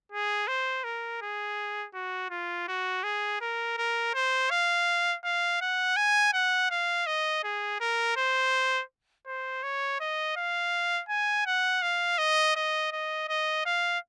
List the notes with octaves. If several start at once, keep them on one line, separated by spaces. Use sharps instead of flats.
G#4
C5
A#4
G#4
F#4
F4
F#4
G#4
A#4
A#4
C5
F5
F5
F#5
G#5
F#5
F5
D#5
G#4
A#4
C5
C5
C#5
D#5
F5
G#5
F#5
F5
D#5
D#5
D#5
D#5
F5